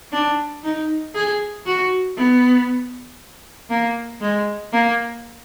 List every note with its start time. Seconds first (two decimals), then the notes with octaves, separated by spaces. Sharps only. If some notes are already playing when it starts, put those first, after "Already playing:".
0.13 D4
0.64 D#4
1.15 G#4
1.66 F#4
2.17 B3
3.70 A#3
4.21 G#3
4.73 A#3